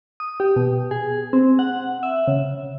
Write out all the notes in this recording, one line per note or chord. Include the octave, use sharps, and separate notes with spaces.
D#6
G4
B2
G#4
C4
F#5
E5
C#3